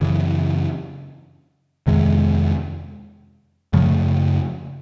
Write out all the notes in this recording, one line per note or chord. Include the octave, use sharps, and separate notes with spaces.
F#2 C#3 E3
F2 C3 D#3 G#3
F#2 C#3 F3 A3